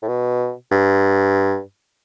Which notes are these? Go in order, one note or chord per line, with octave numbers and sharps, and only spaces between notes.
A2
B2
G2